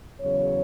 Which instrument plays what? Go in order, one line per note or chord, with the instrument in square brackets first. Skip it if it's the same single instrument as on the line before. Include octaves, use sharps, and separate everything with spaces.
[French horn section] E2 C#3 F#3 C#5